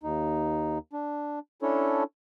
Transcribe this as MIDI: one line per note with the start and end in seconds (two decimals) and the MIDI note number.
0.03 0.78 39
0.03 0.78 63
0.93 1.39 62
1.62 2.03 61
1.62 2.03 62
1.62 2.03 64
1.62 2.03 69
1.62 2.03 73